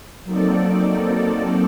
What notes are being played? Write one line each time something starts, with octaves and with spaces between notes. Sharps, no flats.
F#3 A#3 C4 D#4 A4 D5